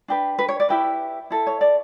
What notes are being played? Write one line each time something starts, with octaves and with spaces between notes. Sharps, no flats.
D4 G4 B4
B4
C#5
D5
E4 G4 B4 E5
E4 A4
C#5
D5